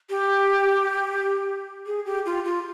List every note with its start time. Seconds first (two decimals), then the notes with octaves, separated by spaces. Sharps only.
0.10 G4
1.86 G#4
2.06 G4
2.26 F4
2.45 F4